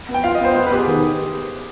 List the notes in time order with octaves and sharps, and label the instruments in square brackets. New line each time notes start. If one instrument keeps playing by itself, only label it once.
[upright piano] B3
[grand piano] G5
[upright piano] F4 [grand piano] F5
[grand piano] D#5
[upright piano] B3 [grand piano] C5
[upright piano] B3 [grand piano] C5
[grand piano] B4
[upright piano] B3 [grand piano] G4
[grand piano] G#4
[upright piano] D#3